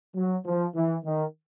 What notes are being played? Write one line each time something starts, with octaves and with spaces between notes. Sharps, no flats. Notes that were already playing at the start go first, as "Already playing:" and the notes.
F#3
F3
E3
D#3